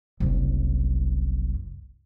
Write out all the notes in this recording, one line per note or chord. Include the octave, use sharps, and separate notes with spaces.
F#1 C2